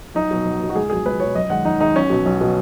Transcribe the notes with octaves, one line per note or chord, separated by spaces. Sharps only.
B1 D#4
B2 F#3
B1
B2 F#3
F#4
C#2 G#4
B2 F#3 G#4
C#2 B4
B2 F#3 C#5
F#2 D#5
D#3 G#3 F#5
F#2 D#4
D#3 G#3 D#4
B1 C#4
B2 F#3
B1
B2 F#3